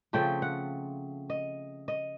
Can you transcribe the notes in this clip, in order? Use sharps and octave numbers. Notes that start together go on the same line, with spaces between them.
C#3 F3 A3 C4 G5
F#5
D#5
D#5